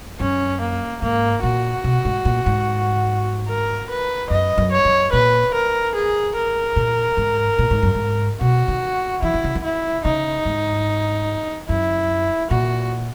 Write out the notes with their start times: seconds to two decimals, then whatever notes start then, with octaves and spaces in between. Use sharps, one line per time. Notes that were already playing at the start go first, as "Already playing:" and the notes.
0.20 F#2 C#4
0.61 A#3
1.02 G#2 A#3
1.43 A#2 F#4
1.84 B2
2.05 G#2
2.25 A#2
2.46 G#2
3.48 A#4
3.90 B4
4.30 F#2 D#5
4.58 F#2
4.72 C#5
4.85 F#2
5.12 A#2 B4
5.53 A#4
5.95 G#4
6.35 A#4
6.76 A#2
7.17 G#2
7.59 A#2
7.71 G#2
7.83 F#2
7.95 G#2
8.41 B2 F#4
8.68 D#3
9.22 E3 E4
9.34 D#3
9.44 C#3
9.55 D#3
9.64 E4
10.04 C#3 D#4
10.45 G#2
11.68 F#2 E4
12.51 A#2 F#4